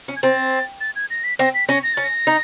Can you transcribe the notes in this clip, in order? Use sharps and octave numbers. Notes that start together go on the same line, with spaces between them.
C#4
G#6
C4 A6
A6
G#6
A#6
B6
C4 A#6
B6
C#4 A#6
A#6
C#4 A6
A#6
D#4